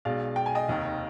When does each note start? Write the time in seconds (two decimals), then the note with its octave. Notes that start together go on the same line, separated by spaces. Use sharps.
0.05 B1 B2 G#3 D5 F5
0.36 G5
0.46 G#5
0.55 D#5 G5
0.68 F1 D#2 D#3